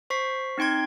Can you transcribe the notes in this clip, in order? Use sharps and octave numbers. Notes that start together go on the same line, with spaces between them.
C5 C#6 B6 C7
C4 D#4 G5 C6 G#6